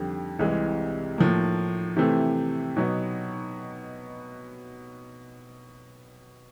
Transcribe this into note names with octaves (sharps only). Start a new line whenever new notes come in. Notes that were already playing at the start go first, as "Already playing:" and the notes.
Already playing: F2 D3 G3
C2 C3 E3 G#3
A2 F3 A#3
C3 E3 A3 C4
B2 F#3 B3 D#4